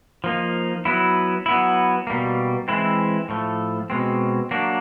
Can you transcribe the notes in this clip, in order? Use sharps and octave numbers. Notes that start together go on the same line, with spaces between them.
F3 A#3 D#4
F#3 B3 E4
F#3 B3 E4
B2 G3 A#3
E3 G#3 C4 E4
A2 F3 A3
B2 G#3 C4
F#3 A#3 D4